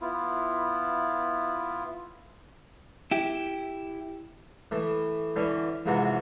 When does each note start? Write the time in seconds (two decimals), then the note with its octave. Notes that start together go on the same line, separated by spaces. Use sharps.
0.01 B3 E4 F4
3.11 E4 G4
4.71 A2 E3
5.36 D3 E3 C#4
5.86 F2 G#2 C3 E3 F#4